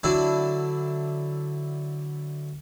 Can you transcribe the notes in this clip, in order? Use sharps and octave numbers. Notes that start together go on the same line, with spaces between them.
D3 F#3 D4 E4